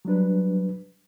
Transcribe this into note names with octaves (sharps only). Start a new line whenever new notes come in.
F#3 G3 D4 B4